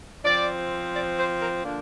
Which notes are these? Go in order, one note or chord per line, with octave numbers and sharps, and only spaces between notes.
F3 C4 D5
D5
C5
A#4
D3 F3 A#3 D4